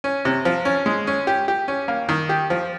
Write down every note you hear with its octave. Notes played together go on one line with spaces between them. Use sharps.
C#4
C3
F3
C#4
G#3
C#4
G4
G4
C#4
A#3
D#3
G4
F3